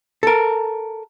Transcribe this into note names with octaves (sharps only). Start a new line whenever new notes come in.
A4 A#4